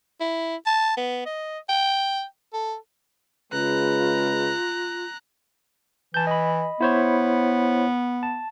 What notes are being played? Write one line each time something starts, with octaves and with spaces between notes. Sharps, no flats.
E4
A5
B3
D#5
G5
A4
C#3 G#3 F4 B4 A#5 F#6
E3 A5 G6
D#5 B5
B3 E4 C5 C#5
A5